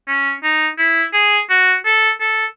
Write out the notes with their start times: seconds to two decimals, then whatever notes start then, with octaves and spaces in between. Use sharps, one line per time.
0.08 C#4
0.43 D#4
0.79 E4
1.14 G#4
1.50 F#4
1.85 A4
2.21 A4